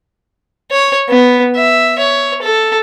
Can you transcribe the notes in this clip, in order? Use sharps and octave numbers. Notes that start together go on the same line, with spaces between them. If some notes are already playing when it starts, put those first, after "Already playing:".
C#5
B3
E5
C#5
A4